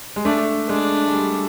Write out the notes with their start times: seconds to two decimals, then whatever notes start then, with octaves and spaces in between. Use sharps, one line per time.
0.16 G#3
0.25 A3 D4
0.69 G#3 D4
1.08 G#3
1.13 G3